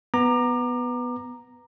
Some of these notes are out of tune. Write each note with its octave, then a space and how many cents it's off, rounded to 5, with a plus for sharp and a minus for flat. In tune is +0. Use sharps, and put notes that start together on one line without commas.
B3 +0 A#5 +0 D6 +30